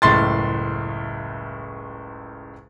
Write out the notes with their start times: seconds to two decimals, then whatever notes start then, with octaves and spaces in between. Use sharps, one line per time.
0.02 F#1 C#2 A2 C6 A6